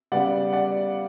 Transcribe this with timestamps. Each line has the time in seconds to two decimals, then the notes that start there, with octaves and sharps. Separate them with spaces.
0.12 C#3 G3 B3 D5 F#5
0.53 D5 F#5